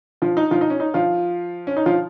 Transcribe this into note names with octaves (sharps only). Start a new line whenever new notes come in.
F3 F4
D#4
F3 F4
D#4
C#4
D#4
F3 F4
C#4
D#4
F3 F4